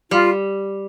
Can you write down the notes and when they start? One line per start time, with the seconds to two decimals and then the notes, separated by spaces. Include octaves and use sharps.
0.11 G3 F4